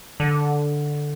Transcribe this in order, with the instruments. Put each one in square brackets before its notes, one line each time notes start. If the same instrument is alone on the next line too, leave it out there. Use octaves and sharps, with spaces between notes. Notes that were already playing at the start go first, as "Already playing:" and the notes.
[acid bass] D3